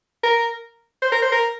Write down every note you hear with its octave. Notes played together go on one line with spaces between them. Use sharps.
A#4
C5
A#4
C5
A#4